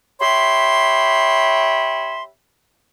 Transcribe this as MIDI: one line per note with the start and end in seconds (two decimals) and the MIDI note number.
0.21 2.23 67
0.21 2.23 73
0.21 2.23 76
0.21 2.23 83
0.21 2.23 84